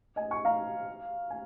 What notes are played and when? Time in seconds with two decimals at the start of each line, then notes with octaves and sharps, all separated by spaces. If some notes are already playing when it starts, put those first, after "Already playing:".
0.16 D#5 G#5
0.31 G#5 C#6
0.45 F5 A#5
1.30 G#5